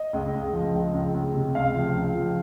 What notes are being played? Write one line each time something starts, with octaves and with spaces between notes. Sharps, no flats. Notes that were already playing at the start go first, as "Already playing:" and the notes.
Already playing: D#5
C#2
C#2
F3
C#2
C#2
C#2
C3
C#2 F5
F3
C#2
F3